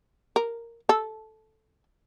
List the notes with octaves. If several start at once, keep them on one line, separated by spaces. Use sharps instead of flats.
A#4
A4